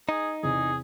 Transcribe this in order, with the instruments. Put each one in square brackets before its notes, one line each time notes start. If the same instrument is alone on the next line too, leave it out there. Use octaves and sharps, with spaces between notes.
[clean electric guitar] D#4 [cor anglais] G#4
[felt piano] E2 C3 [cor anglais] G#4